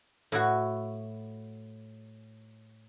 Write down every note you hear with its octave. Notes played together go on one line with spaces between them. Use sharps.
A2 E4 F#4